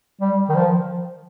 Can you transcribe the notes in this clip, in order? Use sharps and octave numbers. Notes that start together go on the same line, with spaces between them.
G3
D#3
F3